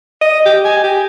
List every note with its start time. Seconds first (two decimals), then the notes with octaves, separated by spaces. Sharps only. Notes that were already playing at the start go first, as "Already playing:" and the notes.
0.21 D#5
0.46 G4
0.65 G#5
0.84 G4